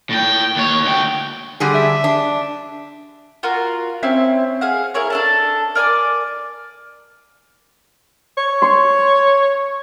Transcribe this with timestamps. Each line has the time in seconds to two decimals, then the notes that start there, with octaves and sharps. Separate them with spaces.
0.10 A2 G5
0.56 D#2 C#5
0.84 D2 G5
1.60 D3 G3 G#4
1.74 E5
2.04 D4
3.43 F4 F#4 A#4
4.03 C4 C#4 E4
4.61 G#4 F5 F#5
4.94 E4 G#4 A#4 C#5
5.10 D4 A4 A5
5.75 A#4 D5 G#5 D6
8.38 C#5
8.62 C6 C#6